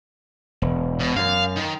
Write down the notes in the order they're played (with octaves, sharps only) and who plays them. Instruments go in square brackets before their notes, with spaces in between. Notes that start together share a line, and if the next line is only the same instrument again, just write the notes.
[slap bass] E1
[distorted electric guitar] B2
[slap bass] F#2 [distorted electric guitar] F5
[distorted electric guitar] D#3